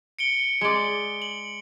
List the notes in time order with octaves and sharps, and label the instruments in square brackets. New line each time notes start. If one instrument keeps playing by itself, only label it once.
[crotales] C#7 D7 G7
[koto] G#3 D5
[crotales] F#7